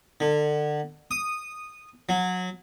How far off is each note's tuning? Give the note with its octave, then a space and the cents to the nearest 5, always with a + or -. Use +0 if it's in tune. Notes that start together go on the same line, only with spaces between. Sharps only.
D3 +30
D#6 -10
F#3 -20